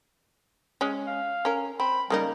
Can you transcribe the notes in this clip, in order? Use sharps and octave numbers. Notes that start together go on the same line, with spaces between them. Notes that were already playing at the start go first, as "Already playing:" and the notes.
G#3 C#4
F5
C#4 A#4
C4 B5
C#3 G3 A#3 D#4